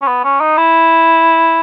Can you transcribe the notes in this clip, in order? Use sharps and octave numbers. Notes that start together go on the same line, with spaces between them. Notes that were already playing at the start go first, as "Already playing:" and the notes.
C#4
B3
C#4
D#4
E4